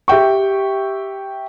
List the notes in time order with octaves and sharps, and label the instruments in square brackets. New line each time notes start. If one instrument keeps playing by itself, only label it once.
[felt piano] G4 E5 G5 C#6